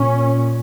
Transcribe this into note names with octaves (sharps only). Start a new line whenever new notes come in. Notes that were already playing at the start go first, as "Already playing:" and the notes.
Already playing: A#2 C#4